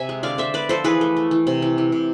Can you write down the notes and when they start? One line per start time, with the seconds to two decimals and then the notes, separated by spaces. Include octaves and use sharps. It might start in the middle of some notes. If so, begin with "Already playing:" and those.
Already playing: C3 E5 G#5
0.09 G#3
0.23 D3 D5 F5
0.38 D3 C5 E5
0.54 B3 B4 D5
0.69 F3 A4 C5
0.84 E3 G#4 B4
1.01 A3
1.17 A3
1.31 E3
1.47 C3
1.62 E3
1.78 E3
1.92 C3